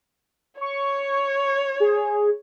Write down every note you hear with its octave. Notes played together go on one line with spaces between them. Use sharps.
C#5 C#6
G#4